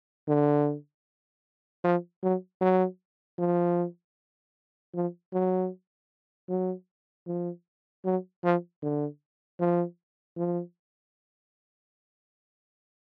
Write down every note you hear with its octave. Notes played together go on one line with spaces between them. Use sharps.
D3
F3
F#3
F#3
F3
F3
F#3
F#3
F3
F#3
F3
D3
F3
F3